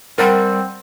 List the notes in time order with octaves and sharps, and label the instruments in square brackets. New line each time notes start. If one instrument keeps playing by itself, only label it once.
[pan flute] G3 [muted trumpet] C4 [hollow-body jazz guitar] A#4 F#5 G5